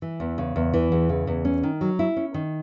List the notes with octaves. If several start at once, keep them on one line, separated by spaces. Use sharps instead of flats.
E3
E2
C#3
E2
E3
E2
C#3
E2
C#4
D#3
F#3
E4
C#4
D#3